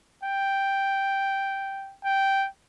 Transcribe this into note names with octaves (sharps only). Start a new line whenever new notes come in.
G5
G5